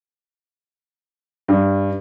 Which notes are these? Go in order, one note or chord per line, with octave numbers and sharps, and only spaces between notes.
G2